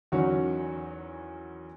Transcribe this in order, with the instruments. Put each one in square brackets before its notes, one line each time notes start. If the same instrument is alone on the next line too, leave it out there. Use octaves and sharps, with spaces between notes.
[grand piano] E2 D#3 F#3 C#4 F#4